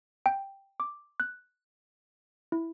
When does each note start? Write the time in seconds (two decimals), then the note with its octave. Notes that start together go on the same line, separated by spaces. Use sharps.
0.26 G5
0.80 D6
1.20 F#6
2.52 E4